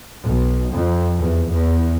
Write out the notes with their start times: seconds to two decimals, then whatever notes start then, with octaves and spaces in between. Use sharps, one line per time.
0.24 B1
0.73 F2
1.20 E2
1.50 E2